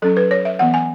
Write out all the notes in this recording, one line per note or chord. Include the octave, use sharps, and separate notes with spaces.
F#3 C#4 A4
B4
C#5
E5
E3 B3 F#5
G#5